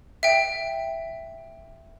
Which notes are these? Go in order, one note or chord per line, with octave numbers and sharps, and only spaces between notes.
E5 G5